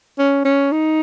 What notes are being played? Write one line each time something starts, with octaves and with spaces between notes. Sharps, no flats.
C#4
C#4
D#4